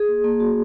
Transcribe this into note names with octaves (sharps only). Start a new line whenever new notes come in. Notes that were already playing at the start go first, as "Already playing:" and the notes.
Already playing: G#4
A#3
A#3
F#4